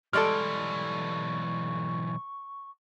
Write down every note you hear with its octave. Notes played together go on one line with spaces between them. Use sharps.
B1 E3 G3 G#3 A4 D5 C#6 F6